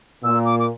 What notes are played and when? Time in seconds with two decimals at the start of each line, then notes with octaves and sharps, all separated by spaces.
0.23 A#2 E6
0.45 D6
0.59 D6